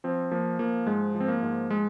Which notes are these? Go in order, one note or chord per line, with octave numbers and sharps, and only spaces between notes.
F3 C4
F3 A#3
F3 A#3
G#2 G#3
F3
C4
A#3
G#2
G#3